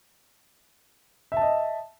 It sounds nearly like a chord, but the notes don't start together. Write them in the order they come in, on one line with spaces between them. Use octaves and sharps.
E5 A5 D#5